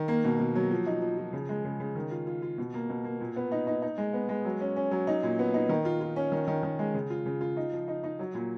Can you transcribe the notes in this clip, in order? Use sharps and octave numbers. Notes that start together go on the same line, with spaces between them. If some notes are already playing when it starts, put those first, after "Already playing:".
Already playing: D#3
A#3
B2
B2
F#3
F3
D#4
F3
F3
C#3
G#3
C#3
C#3
D#3
F4
F4
F4
B2
A#3
B2
A#3
A#2
B3
D#4
D#4
D#4
G#3
B3
G#3
F#3
C#4
C#4
F#3
D#4
A#2
B3
D#4
D#3
F4
F4
C#4
D#3
D#3
D#3
G#3
C#3
F4
C#3
F4
D#4
F3
D#4
D#4
F#3
A#2